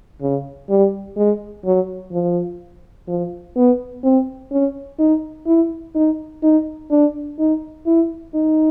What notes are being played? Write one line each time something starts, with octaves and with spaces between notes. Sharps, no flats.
C#3
G3
G#3
F#3
F3
F3
B3
C4
C#4
D#4
E4
D#4
D#4
D4
D#4
E4
D#4